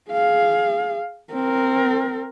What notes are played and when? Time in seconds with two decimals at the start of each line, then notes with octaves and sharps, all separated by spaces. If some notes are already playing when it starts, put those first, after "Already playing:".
0.11 G#4 F5
1.33 C4 A#4